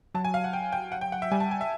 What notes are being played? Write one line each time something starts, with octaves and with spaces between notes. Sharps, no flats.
F#3 A5
G#5
F5
F#5
G5
G5
F#5
G5
F#5
E5
G3 G#5
A5
G#5
E5